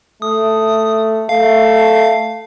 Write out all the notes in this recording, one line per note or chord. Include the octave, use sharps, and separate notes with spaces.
A3 D#6
A3 F5